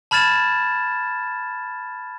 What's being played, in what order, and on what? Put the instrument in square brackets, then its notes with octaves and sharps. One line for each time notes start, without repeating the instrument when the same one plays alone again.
[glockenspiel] A5 B5 F6 G#6 A6 E7